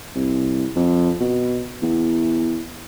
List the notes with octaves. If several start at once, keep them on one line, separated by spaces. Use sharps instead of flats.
C2
F2
B2
E2